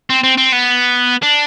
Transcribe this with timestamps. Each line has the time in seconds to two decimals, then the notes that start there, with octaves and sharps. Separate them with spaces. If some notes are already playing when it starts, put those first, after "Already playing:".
0.10 C4
0.23 C4
0.38 C4
0.53 B3
1.23 D4